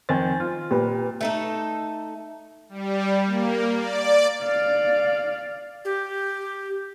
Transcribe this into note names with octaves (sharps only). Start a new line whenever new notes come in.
F2 D#3 C5 G#5 A6
F4
A#2 G4 B4
A3 D#4 A4
G3
A#3
D5
D5 F5
G4